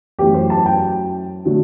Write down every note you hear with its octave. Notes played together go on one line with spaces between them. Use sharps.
F#2 E3 A3 G4
C5
A5
G5
D3 F#3 A3